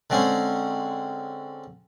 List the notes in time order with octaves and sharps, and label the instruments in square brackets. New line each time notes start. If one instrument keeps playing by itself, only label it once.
[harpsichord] D3 G#3 C4 C#4